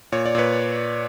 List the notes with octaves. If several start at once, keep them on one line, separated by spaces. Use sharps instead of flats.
A#2 C#5
D5
A#2 B4 C#5